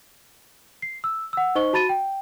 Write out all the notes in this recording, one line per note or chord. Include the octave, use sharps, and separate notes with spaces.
C7
E6
F#5 E6
D#4 C5 D#5 C#6 G7
F#4 A5 B5 A6 D#7
G5